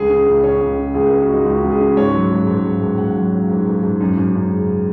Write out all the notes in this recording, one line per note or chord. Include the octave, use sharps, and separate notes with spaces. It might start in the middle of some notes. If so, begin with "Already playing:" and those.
Already playing: C#2 G#4
C#3
C#2
C#3 C#5
C#2
C#3
C#2 G#4
A#4
C#3
F#4
G#3 D#4
C#2 F#4
C#2
G#4
C#3
G#2 C#5
F#3
G#2
G#2
G#2
G#2
G#2 F#5
F#3
F#3
G#2
G#2
G#2
F#2
F#2
F#2
C#3